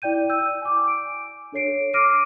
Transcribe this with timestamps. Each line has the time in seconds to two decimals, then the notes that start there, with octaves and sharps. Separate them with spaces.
0.02 E4 D5 G5 G6 D#7
0.30 E6 G6
0.62 G#5 D6
0.88 D7
1.52 D4 A4 C#5 C7 D7
1.94 D6 F6 A#6 C7 D7 D#7